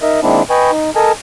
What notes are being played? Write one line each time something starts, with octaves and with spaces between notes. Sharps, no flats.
D#4 A#4 D#5 E5
D#3 G#3 A#3 C4 D4 E4
B4 D#5 G5 G#5 B5 C#6
D#4
A4 A#4 D#5 G#5 A5